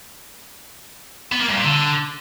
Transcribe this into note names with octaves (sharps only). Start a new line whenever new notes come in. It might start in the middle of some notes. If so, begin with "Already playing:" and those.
B3
A#3
G2
A#2
D3